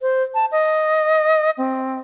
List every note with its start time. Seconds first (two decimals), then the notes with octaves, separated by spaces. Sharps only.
0.02 C5
0.34 A5
0.52 D#5
1.58 C4